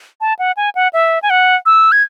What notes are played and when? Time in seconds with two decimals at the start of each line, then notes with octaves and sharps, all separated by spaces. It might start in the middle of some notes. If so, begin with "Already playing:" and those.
0.21 A5
0.39 F#5
0.57 G#5
0.75 F#5
0.93 E5
1.23 G#5
1.30 F#5
1.66 E6
1.92 G#6